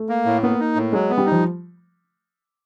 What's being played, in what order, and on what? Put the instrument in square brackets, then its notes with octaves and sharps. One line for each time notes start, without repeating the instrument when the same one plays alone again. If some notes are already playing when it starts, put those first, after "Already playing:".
Already playing: [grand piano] A3
[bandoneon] A#3
A2
[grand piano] A#3 [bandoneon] B3
[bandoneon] D#4
A2
[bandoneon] F#3 [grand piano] G#3
[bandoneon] B3
[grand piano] G3
[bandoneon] D#4
[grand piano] F3